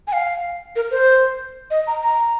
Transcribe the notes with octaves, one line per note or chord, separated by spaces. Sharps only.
G#5
F5
A#4
C5
D#5
A#5
A#5